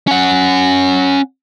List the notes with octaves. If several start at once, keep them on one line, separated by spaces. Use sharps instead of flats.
C#4 F#5